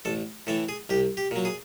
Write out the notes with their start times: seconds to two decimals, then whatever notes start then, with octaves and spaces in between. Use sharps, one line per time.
0.05 A1 A4
0.47 A2 E3 A4
0.69 G#4
0.89 C2 G4
1.17 G4
1.31 A#2 F#3
1.45 G#4